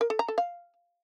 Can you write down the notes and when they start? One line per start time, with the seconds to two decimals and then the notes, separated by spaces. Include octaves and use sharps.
0.01 A#4
0.10 A4
0.19 A#5
0.28 A4
0.38 F5